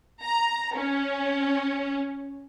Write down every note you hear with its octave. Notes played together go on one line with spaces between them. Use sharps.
A#5
C#4